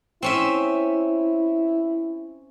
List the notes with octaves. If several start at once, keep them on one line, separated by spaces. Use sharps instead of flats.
C4 C#4 E4 E5